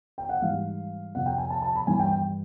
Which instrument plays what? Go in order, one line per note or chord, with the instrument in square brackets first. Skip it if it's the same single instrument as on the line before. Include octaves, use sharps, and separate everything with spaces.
[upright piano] G5
F#5
G#2 E3 G3 F5
F2 C3 F3 F#5
G5
G#5
A5
A5
B5
G2 E3 G3 G#5
G5
G5